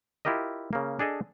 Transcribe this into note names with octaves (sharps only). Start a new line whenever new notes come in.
E4 F4 G4 A#4 D#5
C#3 A#3
D4 G#4 A4 D#5